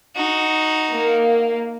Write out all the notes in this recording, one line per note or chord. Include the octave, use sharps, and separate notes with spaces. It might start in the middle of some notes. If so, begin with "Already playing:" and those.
D#4 F#4
A#3